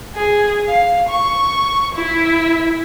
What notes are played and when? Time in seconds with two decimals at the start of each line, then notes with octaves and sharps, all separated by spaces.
0.14 G#4
0.67 F5
1.08 C#6
1.94 E4